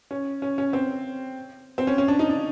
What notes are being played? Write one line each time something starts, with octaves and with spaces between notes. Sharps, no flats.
C#4
C#4
C#4
C4
C4
C#4
C#4
D4
D#4
D4